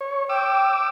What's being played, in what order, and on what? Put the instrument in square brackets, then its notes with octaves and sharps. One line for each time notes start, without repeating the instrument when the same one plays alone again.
[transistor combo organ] C#5
[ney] G5 [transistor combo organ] D6 E6